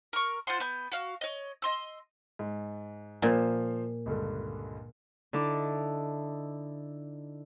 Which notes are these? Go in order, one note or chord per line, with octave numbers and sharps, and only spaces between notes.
A#4 C#6
F4 C5 F#5 C6
B3 G6
F#4 F5
C#5 D#5
D#5 C6 E6
G#2
A#2 F3 C5
C#2 G2 D3
D3 D#4 E4 A4 D6